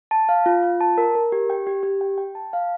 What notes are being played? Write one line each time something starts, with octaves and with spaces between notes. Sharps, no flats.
A5
F5
F4
F4
A5
A#4
A#4
G4
G5
G4
G4
G5
G5
A5
F5